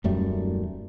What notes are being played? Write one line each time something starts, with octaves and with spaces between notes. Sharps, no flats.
D#1 F#2 G3 A3